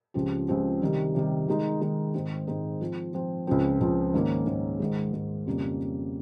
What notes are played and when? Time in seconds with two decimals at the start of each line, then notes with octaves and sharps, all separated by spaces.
0.14 C#2 C#3 F3 C4 G4
0.48 C#2 C#3 F3 C4 G4
0.82 C3 D#3 G3
1.15 C3 D#3 G3
1.48 D#3 G#3 D#4
1.81 D#3 G#3 D#4
2.14 G#2 D#3 G#3 C4 D#4
2.47 G#2 D#3 G#3 C4 D#4
2.81 F3 C4 F4
3.14 F3 C4 F4
3.47 C#2 C#3 F3 C4
3.80 C#2 C#3 F3 C4
4.14 G#2 D#3 A#3 C#4
4.47 G#2 D#3 A#3 C#4
4.80 G#2 D#3 G#3
5.13 G#2 D#3 G#3
5.47 F2 C#3 G3 A#3